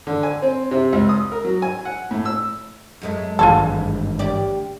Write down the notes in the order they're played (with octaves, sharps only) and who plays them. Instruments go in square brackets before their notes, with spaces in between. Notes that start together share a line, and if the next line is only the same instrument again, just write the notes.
[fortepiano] D3
G#5
C4
C3
C#2
D#6
A#4
F#3
G#5
F#5
A2
E6
[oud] F#2 G#3 A3
[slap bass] G#1 G2 E3 [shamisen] F4 G#4 A4
[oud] D2 G4 D5